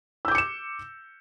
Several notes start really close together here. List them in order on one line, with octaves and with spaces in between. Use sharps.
E6 G6 D6 C#7 E7